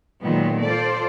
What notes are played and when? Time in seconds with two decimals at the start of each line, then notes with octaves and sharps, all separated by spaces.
0.23 A#2 D#3 F#3 G#3 B3
0.63 F4 A4 C5 D5